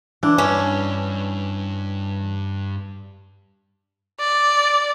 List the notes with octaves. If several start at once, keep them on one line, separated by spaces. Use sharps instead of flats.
E3 D4
G2 C#4
D5